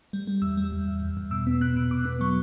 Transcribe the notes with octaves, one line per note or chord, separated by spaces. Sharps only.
G3
G3
E2 E6
G3
E2
E2
E2
E2
B2 E6
B3
B2 F#6
B2
B2 D6
B3
F#3 C#6